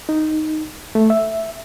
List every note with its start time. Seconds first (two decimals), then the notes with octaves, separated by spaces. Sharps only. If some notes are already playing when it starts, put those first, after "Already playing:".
0.09 D#4
0.95 A3
1.10 E5